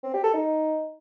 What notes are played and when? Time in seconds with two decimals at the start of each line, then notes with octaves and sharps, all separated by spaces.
0.03 C4
0.14 G4
0.24 A4
0.34 D#4